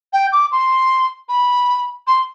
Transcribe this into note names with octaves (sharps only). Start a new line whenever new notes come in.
G5
D6
C6
B5
C6